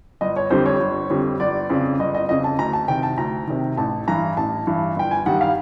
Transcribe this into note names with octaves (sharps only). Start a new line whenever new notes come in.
G1 D#5
C#5
F2 D3 G3 C5
C#5
G1
F2 D3 G3
G1 D5
F2 C#3
G1 D#5
D#5
F2 C#3 D#5
A5
D2 A#5
A5
C3 D#3 G5
A5
D2 A#5
C3 D#3
A1 A5
G2 E3 A#5
A1 A5
G2 E3
G1 G5
G#5
G2 D#3 G3 F#5
F5